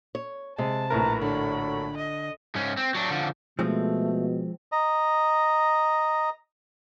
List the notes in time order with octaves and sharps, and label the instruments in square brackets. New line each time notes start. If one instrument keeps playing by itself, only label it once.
[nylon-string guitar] C#5
[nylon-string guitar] C3 [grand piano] G#3 [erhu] A5
[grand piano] A#1 A2 A#4 [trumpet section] B4 A#5
[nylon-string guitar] D3 [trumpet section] F#4 A4 C#5 [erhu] B5
[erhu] D#5
[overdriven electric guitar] G#2 C#4
C4
F#3 D4
D3 F3
[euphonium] B2 [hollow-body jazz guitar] F3 G#3 C4 [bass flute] A3
[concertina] D#5 A#5